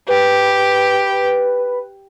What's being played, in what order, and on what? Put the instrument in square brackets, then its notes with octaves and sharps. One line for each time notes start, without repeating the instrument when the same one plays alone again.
[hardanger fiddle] G4 [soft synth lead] B4